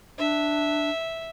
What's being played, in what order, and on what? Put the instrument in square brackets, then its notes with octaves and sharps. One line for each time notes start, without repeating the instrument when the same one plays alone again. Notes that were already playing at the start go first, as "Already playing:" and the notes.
[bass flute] D4 [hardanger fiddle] E5